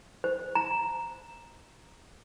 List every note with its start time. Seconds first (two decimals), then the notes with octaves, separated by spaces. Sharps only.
0.24 C5
0.55 A#5